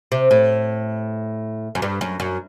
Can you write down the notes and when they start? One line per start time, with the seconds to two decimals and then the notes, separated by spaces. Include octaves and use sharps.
0.12 C3
0.31 A2
1.75 F#2
1.82 G2
2.01 F#2
2.20 F#2